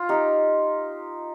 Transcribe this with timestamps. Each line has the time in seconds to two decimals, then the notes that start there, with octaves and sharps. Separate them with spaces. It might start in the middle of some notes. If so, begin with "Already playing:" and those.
Already playing: F4
0.09 D#4 G4